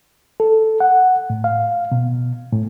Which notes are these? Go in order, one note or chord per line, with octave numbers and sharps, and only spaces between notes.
A4
F#5
A2
F5
B2
A2